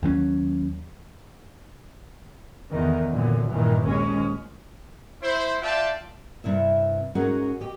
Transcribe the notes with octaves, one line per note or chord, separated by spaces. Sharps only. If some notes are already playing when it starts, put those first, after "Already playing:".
D#2 F#3 C4 C#4
E2 D3 D#3
F#2 A#2 D3 E3
G2 A#2 D#3 E3
A#1 D#2 G#3 C#4
E4 C5
F4 D5 E5 G5 A5
G2 C3 E4 E5
G#2 C#4 F#4 G#4 A#4 F#5
G4 D#5